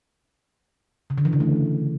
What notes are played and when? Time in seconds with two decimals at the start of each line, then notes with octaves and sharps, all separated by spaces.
1.10 C#3
1.18 D3
1.25 E3
1.33 C#3
1.40 A3